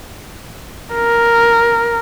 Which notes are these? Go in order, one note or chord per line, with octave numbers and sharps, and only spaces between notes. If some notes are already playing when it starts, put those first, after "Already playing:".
A#4